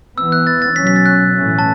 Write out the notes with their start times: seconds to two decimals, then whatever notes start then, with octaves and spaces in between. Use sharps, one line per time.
0.18 E3 B3 E6
0.32 F#6
0.47 A6
0.62 A6
0.76 B2 F#3 C#4 B6
0.87 B6
0.96 A6
1.06 F#6
1.36 A2 E3 A3 C#4
1.59 A5